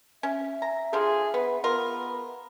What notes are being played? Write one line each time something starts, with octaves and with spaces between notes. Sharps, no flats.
C#4 E5
A#5
D3 F3 F4 G#4
B3 B4
B3 F4 A#4 B4